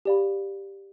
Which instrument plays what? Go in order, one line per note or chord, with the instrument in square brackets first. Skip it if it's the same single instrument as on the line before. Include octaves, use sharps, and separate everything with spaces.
[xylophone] G4 D5 F5 B5